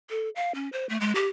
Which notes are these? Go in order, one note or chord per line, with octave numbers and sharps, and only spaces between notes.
A4
F5
C#4
C5
A3
G#3
G4